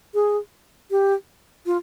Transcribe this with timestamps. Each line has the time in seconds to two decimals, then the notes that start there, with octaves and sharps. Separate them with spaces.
0.14 G#4
0.91 G4
1.66 F4